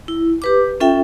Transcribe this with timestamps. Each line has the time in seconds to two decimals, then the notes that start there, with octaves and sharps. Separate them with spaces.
0.08 E4
0.42 G4 B4 D6
0.80 C#4 F4 A4 E5 G5